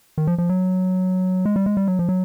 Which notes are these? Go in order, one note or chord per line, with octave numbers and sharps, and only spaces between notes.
D#3
F3
F3
F#3
G#3
G3
G#3
G3
F#3
F3
F#3